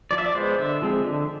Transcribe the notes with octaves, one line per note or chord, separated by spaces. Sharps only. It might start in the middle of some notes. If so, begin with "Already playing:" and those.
F3 D5
E5
D5
G#3 B3 C5
D3 E5
F3 G#3 C4
D3